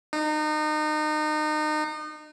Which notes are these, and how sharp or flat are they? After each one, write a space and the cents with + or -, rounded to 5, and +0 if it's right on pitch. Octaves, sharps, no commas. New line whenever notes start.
D#4 -30